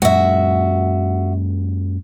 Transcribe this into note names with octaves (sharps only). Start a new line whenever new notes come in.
F#2 A#2 G#3 F#4 E5